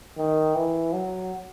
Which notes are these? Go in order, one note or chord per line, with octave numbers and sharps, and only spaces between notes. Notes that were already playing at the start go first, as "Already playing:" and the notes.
D#3
E3
F#3